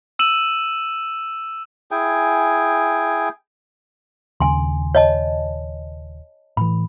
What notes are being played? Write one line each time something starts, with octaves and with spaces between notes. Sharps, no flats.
E6 D#7 E7 F#7
E4 G#4 G5 G#5
D#1 D#2 C#3 G#5 C6
C#5 D#5 A5
A2 E3 B5